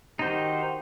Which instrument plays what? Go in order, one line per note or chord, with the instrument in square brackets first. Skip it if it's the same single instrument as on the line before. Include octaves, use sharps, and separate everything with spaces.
[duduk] D#3 [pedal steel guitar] D#4 C5 [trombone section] F#4 G4